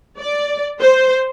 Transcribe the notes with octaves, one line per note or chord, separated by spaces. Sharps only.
D5
C5